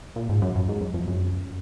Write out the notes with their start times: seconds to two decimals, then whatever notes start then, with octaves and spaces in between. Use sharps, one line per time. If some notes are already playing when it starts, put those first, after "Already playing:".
0.16 A#2
0.29 G#2
0.42 F#2
0.56 F#2
0.69 G#2
0.81 F#2
0.94 F2
1.08 F#2